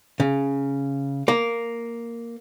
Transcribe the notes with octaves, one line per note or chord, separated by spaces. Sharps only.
C#3
A#3